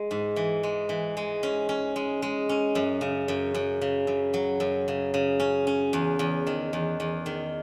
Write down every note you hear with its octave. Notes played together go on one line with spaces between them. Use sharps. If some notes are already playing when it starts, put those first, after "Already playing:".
Already playing: G#3
G#2
E3
G#3
E3
G#3
C#4
C#4
G#3
G#3
C#4
F#2
C#3
F#2
F#2
C#3
F#2
F#3
F#2
C#3
C#3
C#4
C#4
E2
E2
D#3
E2
E2
D#3